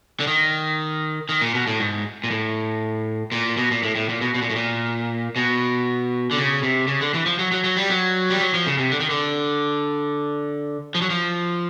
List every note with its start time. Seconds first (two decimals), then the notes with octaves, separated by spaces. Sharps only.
0.20 D3
0.27 D#3
1.29 D#3
1.41 A#2
1.54 B2
1.67 A2
1.80 G#2
2.24 A#2
2.31 A2
3.32 A#2
3.57 B2
3.71 A#2
3.83 A2
3.96 A2
4.09 A#2
4.21 B2
4.34 B2
4.42 A#2
4.50 A2
4.56 A#2
5.36 B2
6.31 D3
6.37 C#3
6.63 C3
6.88 C#3
7.01 D3
7.14 E3
7.26 F3
7.39 F#3
7.52 F#3
7.64 F#3
7.77 G3
7.90 F#3
8.30 G3
8.40 F#3
8.54 F3
8.67 C#3
8.78 C3
8.91 D3
9.00 D#3
9.10 D3
10.95 F3
11.02 F#3
11.10 F3